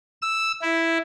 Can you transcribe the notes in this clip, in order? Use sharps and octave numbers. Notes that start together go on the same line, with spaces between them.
E6
E4